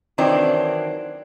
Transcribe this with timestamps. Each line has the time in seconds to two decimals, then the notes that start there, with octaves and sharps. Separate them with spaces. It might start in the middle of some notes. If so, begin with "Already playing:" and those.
0.18 D#3 E3 F#3 C4 D4